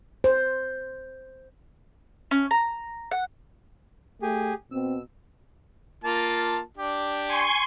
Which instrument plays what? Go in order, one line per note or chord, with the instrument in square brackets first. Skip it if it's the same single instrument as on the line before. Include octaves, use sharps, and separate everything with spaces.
[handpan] C5
[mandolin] C#4
A#5
F#5
[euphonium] A3 [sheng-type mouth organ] G4 G#4
[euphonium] B2 [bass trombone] C4 [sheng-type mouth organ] E6
[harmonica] A#3 F4 A5
D4 G4
[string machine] G#5 C6 C#6